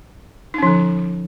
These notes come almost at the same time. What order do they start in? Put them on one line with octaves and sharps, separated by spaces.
D#4 C#4 F3 D3